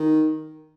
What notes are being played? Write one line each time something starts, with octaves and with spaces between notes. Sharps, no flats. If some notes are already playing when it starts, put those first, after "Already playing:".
Already playing: D#3